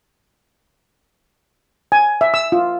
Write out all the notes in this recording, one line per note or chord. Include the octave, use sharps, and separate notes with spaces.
G#5
E5
E6
F4